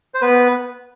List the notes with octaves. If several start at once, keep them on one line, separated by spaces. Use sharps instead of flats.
C5
B3 B4